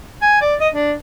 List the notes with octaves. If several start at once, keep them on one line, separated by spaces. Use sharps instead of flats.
G#5
D5
D#5
D4